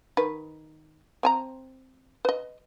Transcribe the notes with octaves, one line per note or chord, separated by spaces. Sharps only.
D#3 B4
C4 G#5 A#5
B4 D#5